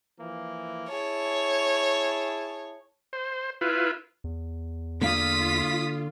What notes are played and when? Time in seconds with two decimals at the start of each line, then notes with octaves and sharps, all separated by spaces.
0.18 E3 F3 A#3
0.89 E4 G#4 C#5 A5
3.13 C5
3.61 E4 F4 B4
4.24 E2
5.02 D3 A#3 F4 F5 D#6 B6